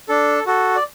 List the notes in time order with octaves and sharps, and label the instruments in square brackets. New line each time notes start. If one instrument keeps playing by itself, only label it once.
[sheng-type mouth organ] D4 A4
F#4 A4
D5